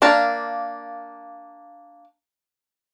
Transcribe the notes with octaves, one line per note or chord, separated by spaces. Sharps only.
A#3 D4 A#4 F5 A5